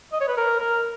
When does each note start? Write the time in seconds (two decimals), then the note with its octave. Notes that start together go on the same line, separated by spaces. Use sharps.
0.13 D#5
0.20 C#5
0.28 B4
0.37 A#4
0.60 A#4